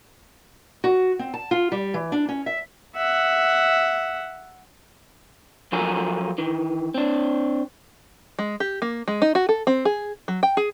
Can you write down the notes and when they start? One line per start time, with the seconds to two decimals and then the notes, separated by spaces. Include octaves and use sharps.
0.84 F#4
1.19 C4
1.34 A5
1.51 F4
1.72 G3
1.94 E3
2.12 D4
2.29 C#4
2.46 E5
2.96 E5 F#5
5.72 F3 F#3 F4 A4 A#4 G#5
6.38 D#3 E3
6.94 C4 D4
8.39 G#3
8.60 G4
8.82 A#3
9.08 G#3
9.22 D#4
9.35 F#4
9.49 A4
9.67 C4
9.85 G#4
10.28 F#3
10.43 G5
10.57 G#4